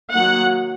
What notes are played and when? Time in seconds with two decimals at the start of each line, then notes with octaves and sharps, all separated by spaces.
0.13 D#3 F#3 A#3 F#5